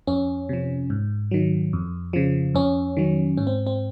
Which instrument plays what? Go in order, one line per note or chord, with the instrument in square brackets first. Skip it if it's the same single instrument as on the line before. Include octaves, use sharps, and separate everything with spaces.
[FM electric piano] F2 C#4
C3 F3
G#2
D#3 F#3
F2
C#3 F3
F2 C#4
D#3 F#3
G#2 C#4
C4
C4